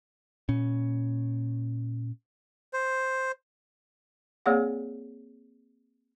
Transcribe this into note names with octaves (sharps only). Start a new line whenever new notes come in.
A#2 C#4
C5
A#3 C4 G#4 C#5 D5 F#5